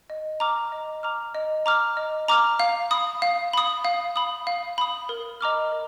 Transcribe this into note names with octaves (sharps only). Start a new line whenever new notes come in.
D#5
A#5 D6 F6
D#5
A#5 D6 F6
D#5
A#5 D6 F6
D#5
A#5 D6 F6
F5
B5 D#6
F5
B5 D#6
F5
B5 D#6
F5
B5 D#6
A#4
D#5 A#5 D6 F6
A#4